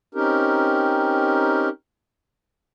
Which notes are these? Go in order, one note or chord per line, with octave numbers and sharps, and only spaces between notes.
C4 C#4 D#4 G4 A#4